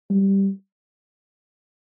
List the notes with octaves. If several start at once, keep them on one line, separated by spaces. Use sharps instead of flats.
G3